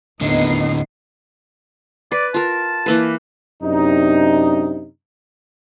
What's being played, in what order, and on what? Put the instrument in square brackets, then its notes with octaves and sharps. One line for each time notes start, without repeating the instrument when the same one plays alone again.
[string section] D#2 B3 C7 [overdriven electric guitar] A2 D3 [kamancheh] D#4 D#5
[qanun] B4 [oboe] D5
[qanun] F4 A#4 [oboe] A5
[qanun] E3 A#3 B4
[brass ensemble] F#2 C3 D4 D#4